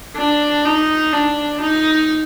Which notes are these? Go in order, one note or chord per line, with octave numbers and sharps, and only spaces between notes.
D4
D#4
D4
D#4